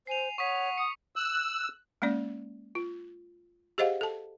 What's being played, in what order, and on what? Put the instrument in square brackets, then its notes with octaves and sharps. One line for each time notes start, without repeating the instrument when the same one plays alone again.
[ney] C5 [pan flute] G#5 [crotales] C7 F7
[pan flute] C#5 [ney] F#5 [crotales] C#6 D#6 B6
[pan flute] D#6 [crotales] C#7
[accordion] E6 [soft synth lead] F#6
[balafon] G#3 A#3 C#4 D5
F4
G4 G#4 C5 D#5 F5 F#5
A4 A5